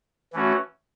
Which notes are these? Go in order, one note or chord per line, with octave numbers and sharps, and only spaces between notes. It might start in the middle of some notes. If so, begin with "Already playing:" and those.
E3 A3 C#4 F#4